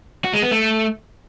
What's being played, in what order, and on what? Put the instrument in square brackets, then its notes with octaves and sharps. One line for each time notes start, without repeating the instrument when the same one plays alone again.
[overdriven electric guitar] F#4
G#3
B3
A3